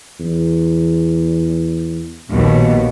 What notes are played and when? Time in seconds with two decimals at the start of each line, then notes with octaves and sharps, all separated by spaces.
0.20 E2
2.30 A#1 D#2 B2